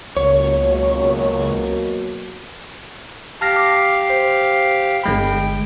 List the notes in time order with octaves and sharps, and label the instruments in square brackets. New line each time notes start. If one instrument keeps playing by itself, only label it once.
[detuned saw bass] C#2 [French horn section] B2 F#3 A#3 [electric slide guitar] C#5
[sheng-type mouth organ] G4 F5 [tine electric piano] A5 F6 A#6
[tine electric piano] D6
C5
[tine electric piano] G1 G#3 B5 [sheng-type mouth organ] G5